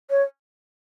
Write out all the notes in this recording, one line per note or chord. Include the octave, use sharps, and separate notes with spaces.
C#5